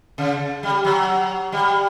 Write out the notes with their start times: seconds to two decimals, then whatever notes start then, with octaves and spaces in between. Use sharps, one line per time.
0.18 C#3
0.63 G3
0.85 F#3
1.52 G3